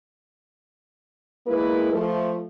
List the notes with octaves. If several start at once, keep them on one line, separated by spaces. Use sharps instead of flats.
G#3 A#3 E4 A#4 B4
F3 A3